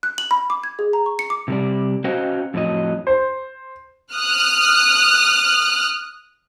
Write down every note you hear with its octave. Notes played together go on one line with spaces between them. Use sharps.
F#6
F#7
B5
D6
G#6
G#4
A#5
C#6
C#7
D6
C3 G3 D5
C#4 F#4 C5 D#5 F5 G5
F2 A2 F#3 D#5
C5
D#6 F6 F#6